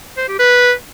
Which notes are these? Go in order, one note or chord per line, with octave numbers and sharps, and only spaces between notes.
C5
G4
B4